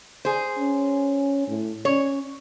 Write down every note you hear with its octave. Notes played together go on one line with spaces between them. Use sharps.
G#4 C5
C#4
A2
C#4 C#5